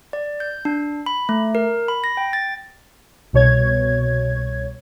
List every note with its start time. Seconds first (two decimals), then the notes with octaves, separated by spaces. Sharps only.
0.13 D5
0.40 G6
0.65 D4
1.06 B5
1.29 A3
1.55 A#4
1.88 B5
2.04 A#6
2.17 G5
2.33 A6
3.33 C2 B2 C#5 G#6